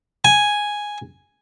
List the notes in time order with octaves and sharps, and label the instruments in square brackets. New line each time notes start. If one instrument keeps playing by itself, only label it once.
[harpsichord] G#5